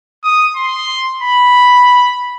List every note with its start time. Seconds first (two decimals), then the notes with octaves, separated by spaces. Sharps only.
0.24 D#6
0.56 C6
1.22 B5